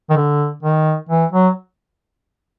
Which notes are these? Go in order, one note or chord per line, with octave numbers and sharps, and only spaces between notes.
D#3
D3
D#3
E3
F#3